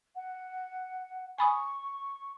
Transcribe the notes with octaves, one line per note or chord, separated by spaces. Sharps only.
F#5
G#5 B5 C#6 D#6